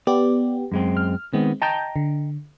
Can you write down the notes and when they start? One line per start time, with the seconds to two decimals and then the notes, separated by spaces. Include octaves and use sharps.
0.07 B3 G4 D5
0.72 F#2 G#3 C4
0.97 F6
1.33 D#3 G#3 B3 C4
1.62 D#5 G5 A5 A#5 G6
1.96 D3